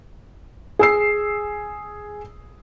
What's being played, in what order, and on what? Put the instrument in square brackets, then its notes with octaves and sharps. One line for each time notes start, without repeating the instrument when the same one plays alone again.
[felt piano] G#4 E6 C7